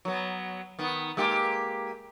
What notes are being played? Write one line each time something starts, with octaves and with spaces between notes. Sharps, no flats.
F#3 B3
D#3 B3
G#3 A#3 G4